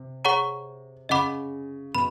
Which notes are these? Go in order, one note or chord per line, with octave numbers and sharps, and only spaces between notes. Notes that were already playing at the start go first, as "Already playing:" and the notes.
Already playing: C3
G#4 C#5 F#5 A#5 C#6
C#3 D#5 F#5 B5 D6
B2 B5